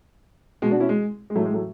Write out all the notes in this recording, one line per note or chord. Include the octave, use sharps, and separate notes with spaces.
B2 G#3
D4 F#4
C#4 E4
G#3
G#3
A2 E3 F#3 A3
G#3
F#3 A3